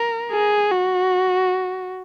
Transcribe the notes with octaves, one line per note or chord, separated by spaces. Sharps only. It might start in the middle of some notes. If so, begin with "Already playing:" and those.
Already playing: A#4
G#4
F#4